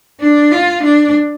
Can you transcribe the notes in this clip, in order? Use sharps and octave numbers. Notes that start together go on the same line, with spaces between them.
D4
F4
D4